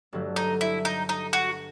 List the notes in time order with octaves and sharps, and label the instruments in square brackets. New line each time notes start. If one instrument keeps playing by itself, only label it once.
[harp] G1 G2 F#3 A3
[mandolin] D#4
E4
D#4
D#4
F#4